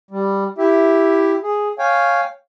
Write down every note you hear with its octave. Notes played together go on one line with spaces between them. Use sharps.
G3
E4 G4 E5
G#4
C#5 F5 G5 G#5